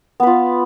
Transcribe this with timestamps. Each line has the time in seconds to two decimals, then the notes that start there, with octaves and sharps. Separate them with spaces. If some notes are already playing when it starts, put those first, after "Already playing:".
0.20 B3
0.23 B4
0.27 F4